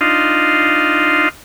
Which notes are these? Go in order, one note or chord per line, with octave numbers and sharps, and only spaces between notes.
D4 D#4 F4 D#5 F5 C6